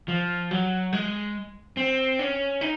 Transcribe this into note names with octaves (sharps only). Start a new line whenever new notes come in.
F3
F#3
G#3
C4
C#4
D#4